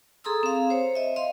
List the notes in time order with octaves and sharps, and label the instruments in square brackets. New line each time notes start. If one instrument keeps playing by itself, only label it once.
[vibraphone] G#4 A4 A#5 C6 D#6 E6
C4 F5
C5 C#5
D#5 E5
D#5 F5 C6